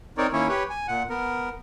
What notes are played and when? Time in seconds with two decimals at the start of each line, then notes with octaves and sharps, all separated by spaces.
0.18 C4 D#4 A#4 C#5 D5
0.33 D#3 A#3 C#4 E4 C#5
0.48 G4 B4 C#5
0.70 G#5
0.88 A#2 F#5
1.10 B3 A#4